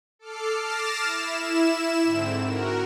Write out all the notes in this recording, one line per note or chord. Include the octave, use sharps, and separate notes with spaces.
A4 D6 F6 C7
D6 F6 A6 A#6 C7 E7
E4 E7
G#2 D3 C4
F#4 A#4